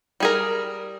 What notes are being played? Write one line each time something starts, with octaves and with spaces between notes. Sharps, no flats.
G3 G#4 A#4